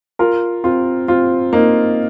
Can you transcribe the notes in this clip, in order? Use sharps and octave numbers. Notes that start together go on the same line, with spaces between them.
F4 A#4
C4 F4
C4 F4
A#3 D#4